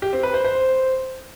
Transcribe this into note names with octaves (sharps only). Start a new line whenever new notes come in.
G4
C4
B4
C5
C5